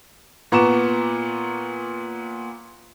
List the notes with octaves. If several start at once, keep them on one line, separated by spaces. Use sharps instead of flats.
A#2 B3 A#5 C#6 D6 E7